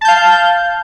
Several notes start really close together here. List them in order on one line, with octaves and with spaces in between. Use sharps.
A5 G6 F5